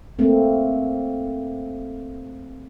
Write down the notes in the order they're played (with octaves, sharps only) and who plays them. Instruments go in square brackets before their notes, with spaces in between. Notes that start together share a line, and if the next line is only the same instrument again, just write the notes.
[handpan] A3 A#3 C4